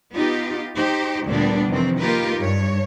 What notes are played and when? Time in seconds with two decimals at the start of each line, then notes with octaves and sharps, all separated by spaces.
0.13 B3 D#4 F4 G4
0.75 D#4 G4 C5
1.26 D2 A#2 D3 G3 B3 D4
1.68 F2 C3 D#3 E3 C4
1.99 A#3 D#4 F4 G4 A#4 B4
2.38 G2 C#5